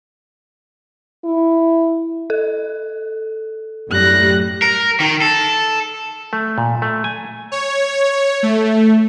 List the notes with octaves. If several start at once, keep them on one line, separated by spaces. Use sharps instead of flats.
E4
A4
F#2 A2 G3 F#6 A#6
A#4
D#3
A4
A3
A#2
A3
G#5
C#5
A3